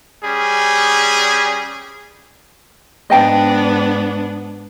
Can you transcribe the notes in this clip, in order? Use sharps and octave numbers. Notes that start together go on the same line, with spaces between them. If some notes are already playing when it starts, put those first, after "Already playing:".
G3 C#4 G#4
G#2 B3 D4 D#5 G5 A5